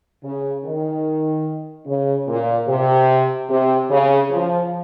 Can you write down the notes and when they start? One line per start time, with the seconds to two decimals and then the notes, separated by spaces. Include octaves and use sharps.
0.23 C#3
0.65 D#3
1.87 C#3
2.27 A#2
2.68 C3
3.50 C3
3.90 C#3
4.30 F3